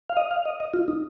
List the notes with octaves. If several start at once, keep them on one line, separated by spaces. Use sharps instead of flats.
F5
D#5
F5
D#5
D#5
F4
D#4